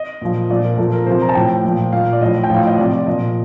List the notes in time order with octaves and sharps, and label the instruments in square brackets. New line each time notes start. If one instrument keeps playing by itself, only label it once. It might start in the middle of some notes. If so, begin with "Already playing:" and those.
Already playing: [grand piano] D#5
A#2 F3
A#2 F3 D5
A#4
A#2 F3 A4
A#4
C3 F3 C5
A#5
A5
A2 F3 G5
A#2 F3
A#2 F3 F5
D5
A2 F3 D#5
G5
A2 F3 F5
D#5
C3 F3 D5
D5
A#2 F3 D#5